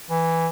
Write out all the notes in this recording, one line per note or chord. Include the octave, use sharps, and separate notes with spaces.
E3